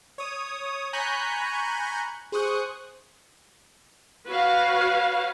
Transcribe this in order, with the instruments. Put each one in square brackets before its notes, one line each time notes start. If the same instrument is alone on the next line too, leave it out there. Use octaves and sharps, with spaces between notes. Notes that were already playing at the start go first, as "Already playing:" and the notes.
[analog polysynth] C#5 D#6
G#5 A#5 B5 C#6 F#6 G6
G#4 C5 C#6 D#6 F#6
[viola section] F#4 B4 C#5 F5